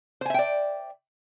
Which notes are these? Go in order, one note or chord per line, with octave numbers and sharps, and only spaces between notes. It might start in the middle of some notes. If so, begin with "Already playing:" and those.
C5 D5 E5 G5 G#5